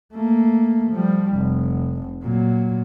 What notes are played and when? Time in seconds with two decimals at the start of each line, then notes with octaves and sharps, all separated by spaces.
0.14 A3 A#3
0.93 F3 G3
1.36 F1
2.23 A#2 F#3